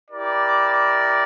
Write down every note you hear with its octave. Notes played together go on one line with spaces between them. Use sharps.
E4 G4 A#4 D5